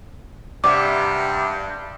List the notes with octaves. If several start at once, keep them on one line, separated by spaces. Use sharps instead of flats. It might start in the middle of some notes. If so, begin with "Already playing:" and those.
G2 C3 D5 E5 F#5 D6